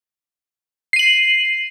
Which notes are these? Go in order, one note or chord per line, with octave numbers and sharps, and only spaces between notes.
C7 D#7 F#7